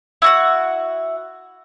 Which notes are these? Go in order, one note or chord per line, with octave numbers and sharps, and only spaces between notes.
E4 F#4 F#5